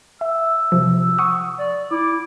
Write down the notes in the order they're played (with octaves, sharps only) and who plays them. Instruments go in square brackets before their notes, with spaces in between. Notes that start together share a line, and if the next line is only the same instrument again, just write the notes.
[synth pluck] E5 [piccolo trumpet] E6
[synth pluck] C3 F3
F#5 C#6 D#6
[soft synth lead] D5
[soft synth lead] E4 [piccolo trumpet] D6